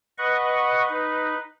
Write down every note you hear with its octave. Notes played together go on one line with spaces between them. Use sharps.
B4 D#5 F#5 C#6
D#4 B4